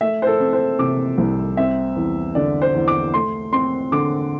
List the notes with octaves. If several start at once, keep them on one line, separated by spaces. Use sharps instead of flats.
A3 E5
C5
A4
C4
C5
C3 D6
C2
C4 E5
E2
D3 D5
C5
E2
D6
A3 C6
C4 C6
D3 D6